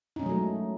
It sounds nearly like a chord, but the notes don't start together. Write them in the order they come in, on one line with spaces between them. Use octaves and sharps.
D#4 C#4 G#3 F#3 A3